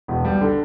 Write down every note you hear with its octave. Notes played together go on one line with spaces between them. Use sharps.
E1
G3
D3